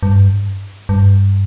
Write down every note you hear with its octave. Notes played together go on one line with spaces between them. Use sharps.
G2
G2